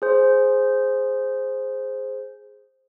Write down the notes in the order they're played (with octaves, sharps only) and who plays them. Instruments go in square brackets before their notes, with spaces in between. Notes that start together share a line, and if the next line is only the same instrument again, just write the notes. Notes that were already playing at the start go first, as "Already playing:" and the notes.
[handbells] G#4 C5